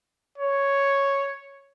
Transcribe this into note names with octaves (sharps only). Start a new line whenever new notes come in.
C#5